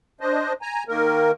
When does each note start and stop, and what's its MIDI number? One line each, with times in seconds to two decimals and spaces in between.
0.21 0.53 62
0.21 0.53 72
0.21 0.53 75
0.62 0.83 80
0.62 0.83 82
0.88 1.31 51
0.88 1.31 58
0.88 1.31 70